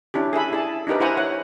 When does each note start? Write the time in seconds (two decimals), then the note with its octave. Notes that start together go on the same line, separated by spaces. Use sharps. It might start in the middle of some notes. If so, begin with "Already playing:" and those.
0.14 C#4 D4 E4 G4
0.33 G#4 A4 E5 B5
0.52 E4 G#4 D5 A5
0.87 D4 D#4 G4 A#4 B4
1.00 E4 B4 C5 F#5 G#5 A#5
1.17 C#5 F#5